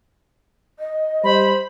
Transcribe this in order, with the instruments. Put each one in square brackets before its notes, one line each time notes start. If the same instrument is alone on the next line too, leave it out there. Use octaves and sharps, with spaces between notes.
[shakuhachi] D#5
[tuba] G3 [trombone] C5 [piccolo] B5